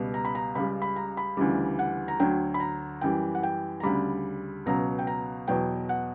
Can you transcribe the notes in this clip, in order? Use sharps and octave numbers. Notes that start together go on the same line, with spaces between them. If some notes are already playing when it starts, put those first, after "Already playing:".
Already playing: C#2 B2 G3
A#5
B5
A#5
C#2 C#3 G3 B5
B5
A#5
B5
D2 C#3 E3 G3
F#5
A#5
D2 D3 F#3 G5
B5
A#5
F#2 E3 G3 G5
F#5
G5
A#5
D2 C#3 G3 B5
C#2 B2 F#3 A#5
G5
A#5
E2 B2 F#3 G5
F#5